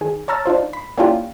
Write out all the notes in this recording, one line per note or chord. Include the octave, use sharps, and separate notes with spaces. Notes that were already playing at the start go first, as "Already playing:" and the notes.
D#3 G#4
C#5 A5 A#5 E6 F6 A6
D4 D#4 F4 C5
B5
A#3 C#4 D4 E4 F4 G4